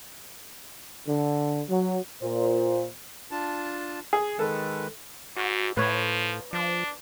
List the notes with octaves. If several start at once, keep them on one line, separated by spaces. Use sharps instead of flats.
D3
F#3
A#2 C5
D4 F4 A5
G#4
D#3 G#3 A4 B4
G#2 F#4
A2 F3 B4 C#5
F3 D4